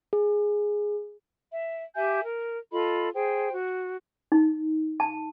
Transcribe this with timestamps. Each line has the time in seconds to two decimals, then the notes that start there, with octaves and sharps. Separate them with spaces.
0.13 G#4
1.51 E5
1.96 G4 E5 G#5 G6
2.23 A#4
2.72 F4 A4 D#5 B5
3.14 G#4 C5 G5
3.53 F#4
4.32 D#4
5.00 A5